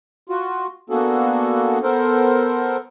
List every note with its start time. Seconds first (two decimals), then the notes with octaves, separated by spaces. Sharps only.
0.29 F4 F#4
0.90 A#3 B3 D4 F#4 G#4 A4
1.83 B3 A4 A#4 C5